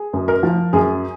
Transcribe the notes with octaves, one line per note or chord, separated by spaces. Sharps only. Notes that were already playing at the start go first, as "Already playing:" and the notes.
Already playing: G#4
F#2
A#4
F3
F#2 G#4